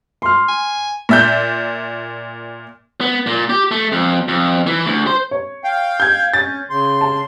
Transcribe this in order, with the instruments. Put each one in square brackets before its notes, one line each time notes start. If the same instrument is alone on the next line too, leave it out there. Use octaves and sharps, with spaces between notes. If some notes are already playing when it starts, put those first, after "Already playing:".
[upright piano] C6 F6
[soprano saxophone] G#5
[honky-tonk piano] A#2 E5 G6
[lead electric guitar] B3
A#2
G4
A3
F2
F2
E3
D2
C5
[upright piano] C#5
[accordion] F5 G5
[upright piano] G6 G#6
[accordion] C#4 [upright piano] A6
[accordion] C#3 C6
[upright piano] A5